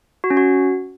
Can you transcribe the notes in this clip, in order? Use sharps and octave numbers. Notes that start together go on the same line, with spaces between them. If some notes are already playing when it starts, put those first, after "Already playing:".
F#4
C#4
F#4